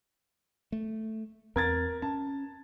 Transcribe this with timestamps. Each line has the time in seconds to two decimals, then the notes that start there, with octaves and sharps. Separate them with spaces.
0.72 A3
1.56 E2 C4 A#4 G#6 A6
2.02 C#4 A5